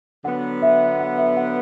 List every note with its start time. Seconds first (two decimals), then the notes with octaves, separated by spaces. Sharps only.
0.25 D3 F#3 B3 F#5
0.62 E5
1.00 F#5
1.18 E5
1.33 E5
1.37 F#5